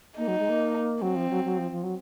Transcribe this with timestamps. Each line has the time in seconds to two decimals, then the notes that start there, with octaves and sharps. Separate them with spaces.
0.18 A#3 D#4
0.28 F#3
0.39 G#3
0.49 A#3
1.02 F#3 C4
1.16 F3
1.30 F#3
1.44 F#3
1.58 F3
1.72 F3
1.83 F#3